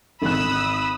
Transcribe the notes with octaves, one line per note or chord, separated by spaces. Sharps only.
G#1 B5 D#6 E6 F#6